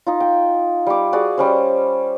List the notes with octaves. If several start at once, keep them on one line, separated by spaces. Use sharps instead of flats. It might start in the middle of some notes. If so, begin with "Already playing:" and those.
D#4 F4
G5
G3 D6
F#4 G#4 D5
G3 C#4 C5